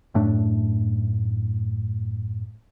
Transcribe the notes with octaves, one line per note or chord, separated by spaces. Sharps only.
F#2 A2 A3 D4